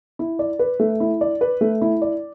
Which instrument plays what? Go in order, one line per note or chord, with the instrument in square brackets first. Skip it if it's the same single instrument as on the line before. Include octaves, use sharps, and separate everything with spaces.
[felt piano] E4
D5
B4
A3
E4
D5
B4
A3
E4
D5